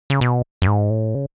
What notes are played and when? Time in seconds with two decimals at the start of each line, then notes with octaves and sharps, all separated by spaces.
0.10 C#3
0.21 B2
0.62 F#2
0.67 G#2
0.90 A2
1.15 C#3